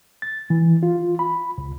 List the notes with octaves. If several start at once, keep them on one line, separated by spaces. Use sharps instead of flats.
A6
E3
F4
B5
C#2